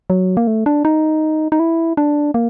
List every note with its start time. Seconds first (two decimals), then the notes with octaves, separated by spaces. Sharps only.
0.10 F#3
0.37 A#3
0.47 A3
0.66 D4
0.85 D#4
1.52 D#4
1.60 E4
1.97 D4
2.34 A#3